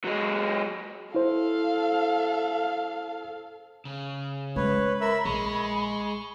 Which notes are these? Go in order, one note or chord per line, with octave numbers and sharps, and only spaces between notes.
F#3 G#3
E4 A4 C5 F5
C#3
G#3 C#4 B4 C#5 B5
A#4 E5 E6
A#1 G#3 C#6